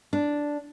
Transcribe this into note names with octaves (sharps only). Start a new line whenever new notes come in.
D4